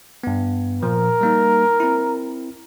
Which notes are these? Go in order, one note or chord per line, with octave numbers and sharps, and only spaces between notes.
G2 B3
A#2 F3 A#4
G3 A#3 D#4
C4 E4